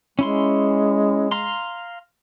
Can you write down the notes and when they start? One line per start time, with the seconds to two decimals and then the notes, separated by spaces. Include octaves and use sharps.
0.19 G#3 C#4 E4 C6
1.31 F5 A#5 C6